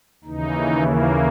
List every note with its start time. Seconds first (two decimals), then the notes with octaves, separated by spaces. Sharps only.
0.24 D#2 C#3 E3 D#4
0.81 A#3